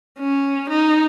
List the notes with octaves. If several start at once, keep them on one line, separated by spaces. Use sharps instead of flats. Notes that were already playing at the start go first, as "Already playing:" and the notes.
C#4
D#4